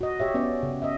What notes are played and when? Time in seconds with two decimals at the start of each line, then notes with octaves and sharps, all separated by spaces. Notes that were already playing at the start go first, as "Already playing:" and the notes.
0.01 F#4 D#5
0.20 G4 C#5 E5
0.34 B3 C#4 D5
0.63 C#3
0.82 D#5 E5